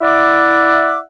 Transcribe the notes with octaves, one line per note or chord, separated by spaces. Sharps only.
E4 D5 E5 F#5 D6